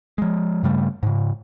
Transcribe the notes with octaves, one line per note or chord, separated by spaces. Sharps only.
F3 G#3
G2 C#3 G3 A3
G#2 C#3